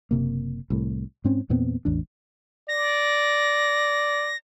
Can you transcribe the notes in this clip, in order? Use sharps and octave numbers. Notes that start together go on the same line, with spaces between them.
F#1 C3 A#3
C2 A2
G#2 C4 C#4
E2 A#2 B3 C4
A1 E2 D4
D5 A#6